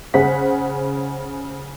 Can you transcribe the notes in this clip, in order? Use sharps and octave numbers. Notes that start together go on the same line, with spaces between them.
C#3 G#4 C5 F#5 B6